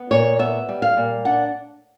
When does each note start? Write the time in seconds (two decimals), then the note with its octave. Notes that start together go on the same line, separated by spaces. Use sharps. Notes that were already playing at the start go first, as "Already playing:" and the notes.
Already playing: B3
0.11 A#2 C#5
0.39 B3 E5
0.69 G3
0.82 F5
0.97 A#2
1.25 D4 F#5